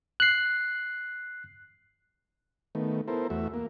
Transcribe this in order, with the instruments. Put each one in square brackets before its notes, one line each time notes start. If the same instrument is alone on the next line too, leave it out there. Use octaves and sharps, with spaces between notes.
[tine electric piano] F#6 C7
[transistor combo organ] D#3 A3 B3
B3 E4 A4 A#4 C5
E2 A3 F#4 E5
A#3